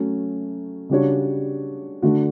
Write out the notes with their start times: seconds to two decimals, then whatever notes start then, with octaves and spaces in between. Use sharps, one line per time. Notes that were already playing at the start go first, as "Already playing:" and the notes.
Already playing: F#3 A3 C#4
0.90 C#3 G3 D4 F#4 C#5
2.02 D3 A3 D4 F#4